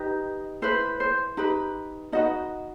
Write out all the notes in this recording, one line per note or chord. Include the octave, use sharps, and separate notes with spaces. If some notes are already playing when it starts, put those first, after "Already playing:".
Already playing: D#4 G4 B4 D#5
E4 B4 C5
C5
D#4 G4 B4
D#4 F#4 B4 D#5